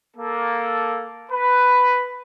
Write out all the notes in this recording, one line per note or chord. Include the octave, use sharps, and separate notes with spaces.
A#3 A4
B4